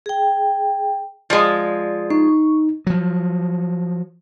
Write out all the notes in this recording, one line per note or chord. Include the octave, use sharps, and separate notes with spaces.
G#4 G5
F3 G#3 D5
D#4 C#6
F3 F#3